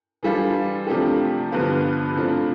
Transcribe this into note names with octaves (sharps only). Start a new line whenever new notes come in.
E3 G3 D4 F4 A4
C3 F3 A3 D4 G4
G2 D3 F3 B3 F4
C3 F3 A3 D4